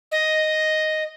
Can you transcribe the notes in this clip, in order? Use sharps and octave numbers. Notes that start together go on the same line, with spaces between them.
D#5